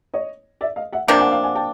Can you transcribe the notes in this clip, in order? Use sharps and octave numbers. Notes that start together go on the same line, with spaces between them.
C#5 D#5
D5 E5
D#5 F5
E5 F#5
C3 F3 A#3 D4 F5 G5
F#5 G#5
F5 G5
F#5 G#5
G5 A5